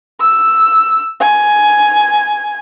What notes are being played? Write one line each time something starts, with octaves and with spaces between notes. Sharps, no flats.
E6
G#5